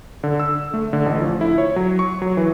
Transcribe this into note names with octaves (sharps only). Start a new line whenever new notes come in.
D3
E6
A3
D3
A1
F3
E4
C#5
F#3
C#6
F#3
E3